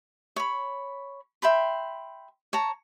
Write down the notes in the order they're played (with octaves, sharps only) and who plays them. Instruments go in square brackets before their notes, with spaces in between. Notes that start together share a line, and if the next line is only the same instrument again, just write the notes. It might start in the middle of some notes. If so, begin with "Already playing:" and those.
[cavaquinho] C#5 B5
E5 G5 B5 C6
C#5 A5 A#5